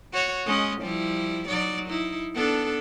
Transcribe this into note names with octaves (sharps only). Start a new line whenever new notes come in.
F#4 C#5
G#3 C#4 D#5
F3 G3 E4
F#3 D#4 D5
D#4 E4
B3 D4 A4